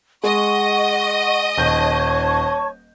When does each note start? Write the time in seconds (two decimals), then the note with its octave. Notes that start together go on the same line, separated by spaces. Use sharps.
0.23 G#3 D#5 F#5 C#6
1.57 D#1 C#5 A5 C#6 G6 G7